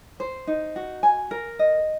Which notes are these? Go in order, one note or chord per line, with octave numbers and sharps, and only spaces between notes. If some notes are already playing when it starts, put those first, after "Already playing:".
C5
D#4
F#4
G#5
A#4
D#5